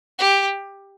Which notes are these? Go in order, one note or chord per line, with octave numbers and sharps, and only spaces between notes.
G4